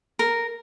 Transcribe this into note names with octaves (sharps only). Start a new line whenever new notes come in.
A#4